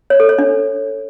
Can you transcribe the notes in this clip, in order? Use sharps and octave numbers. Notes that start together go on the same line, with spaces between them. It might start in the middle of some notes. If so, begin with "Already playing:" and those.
C#5
A4
C#5
D4